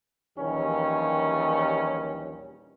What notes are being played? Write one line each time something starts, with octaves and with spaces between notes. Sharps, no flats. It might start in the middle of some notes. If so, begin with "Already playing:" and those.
A#1 D#2 E3 G3 C#4